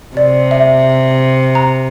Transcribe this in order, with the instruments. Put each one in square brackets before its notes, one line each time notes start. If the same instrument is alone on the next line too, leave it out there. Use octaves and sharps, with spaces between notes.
[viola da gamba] C3 [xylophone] D5
[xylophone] E5
A#5